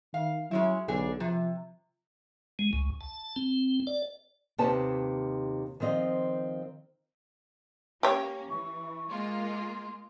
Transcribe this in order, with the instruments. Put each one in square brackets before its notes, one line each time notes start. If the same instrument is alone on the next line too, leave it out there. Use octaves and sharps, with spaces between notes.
[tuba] D#3 [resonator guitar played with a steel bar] F5
[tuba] F#3 [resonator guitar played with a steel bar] G#3 C#4 E4
[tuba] B1 [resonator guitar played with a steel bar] D3 G#4
[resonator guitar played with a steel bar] C3 [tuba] F3
[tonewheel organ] G#3
C#2
A5
C4
D5
[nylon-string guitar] D#2 C3 D#3 B4 A5
D#3 F3 C4 D#5
[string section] A#3 C#4 [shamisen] G4 C#5
[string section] E3 [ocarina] C#6
[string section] G#3 A#3 F4 [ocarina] C6